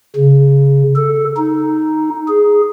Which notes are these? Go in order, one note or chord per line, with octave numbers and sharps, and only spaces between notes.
C#3
A4
D#4
G#4